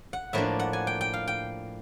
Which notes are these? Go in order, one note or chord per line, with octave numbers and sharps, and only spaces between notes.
F#5
A2 F3 A#3 D4 E5
F#5
G#5
G5
G5
F5
G5